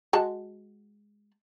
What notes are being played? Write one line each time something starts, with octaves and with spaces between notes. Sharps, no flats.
G#3 F#4 A5